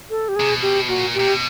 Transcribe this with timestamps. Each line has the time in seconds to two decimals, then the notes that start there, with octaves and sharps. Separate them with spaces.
0.10 A4
0.29 G4
0.36 C3 G#4
0.49 B2
0.62 G4
0.88 A#2 F#4
1.14 G4
1.20 A#2
1.27 B2